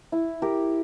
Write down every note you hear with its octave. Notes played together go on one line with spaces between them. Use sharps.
E4
G4 A#4